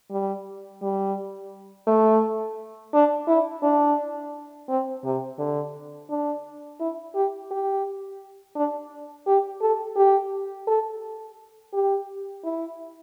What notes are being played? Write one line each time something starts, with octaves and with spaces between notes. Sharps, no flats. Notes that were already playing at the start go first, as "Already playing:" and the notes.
G3
G3
A3
D4
E4
D4
C4
C3
D3
D4
E4
G4
G4
D4
G4
A4
G4
A4
G4
E4